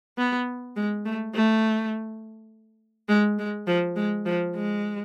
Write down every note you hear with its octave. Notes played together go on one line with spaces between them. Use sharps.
B3
G#3
A3
A3
G#3
G#3
F3
G#3
F3
G#3